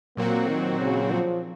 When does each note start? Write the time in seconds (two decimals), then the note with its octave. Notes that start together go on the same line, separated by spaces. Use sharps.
0.17 A#2 F#3 A#3 C4 F#4
0.49 D#3
0.81 C#3
1.11 F3